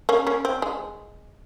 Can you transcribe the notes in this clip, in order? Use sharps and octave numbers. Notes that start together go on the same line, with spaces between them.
A#3 C#4
A#3 C#4
C4
G#3